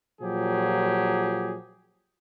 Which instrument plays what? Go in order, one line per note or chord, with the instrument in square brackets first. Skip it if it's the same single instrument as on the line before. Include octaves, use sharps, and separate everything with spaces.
[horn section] A#2 F3 F#3 G4 G#4